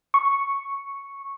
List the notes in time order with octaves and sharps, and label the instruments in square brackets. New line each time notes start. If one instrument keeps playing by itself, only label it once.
[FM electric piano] C#6